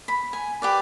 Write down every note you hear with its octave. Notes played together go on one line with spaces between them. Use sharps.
B5
G#5
G4 B4 D5